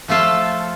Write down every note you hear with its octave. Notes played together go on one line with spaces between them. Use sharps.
F3 A3 F4 A4